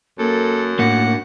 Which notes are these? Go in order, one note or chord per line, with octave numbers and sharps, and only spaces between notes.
F#2 A#3 A4
A2 A#3 D4 F#5